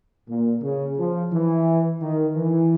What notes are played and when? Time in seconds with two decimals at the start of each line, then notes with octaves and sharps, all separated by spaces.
0.29 A#2
0.62 C#3
0.98 F3
1.32 E3
2.02 D#3
2.37 E3